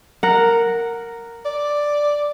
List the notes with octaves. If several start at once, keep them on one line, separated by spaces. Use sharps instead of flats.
A#4 F#5
D5